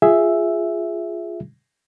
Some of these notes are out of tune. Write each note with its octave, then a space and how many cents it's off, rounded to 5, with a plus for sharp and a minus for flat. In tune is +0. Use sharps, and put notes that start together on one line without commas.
F4 +0 G#4 +0 E5 +0